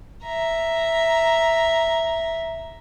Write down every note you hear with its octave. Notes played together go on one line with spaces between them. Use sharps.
E5 A#5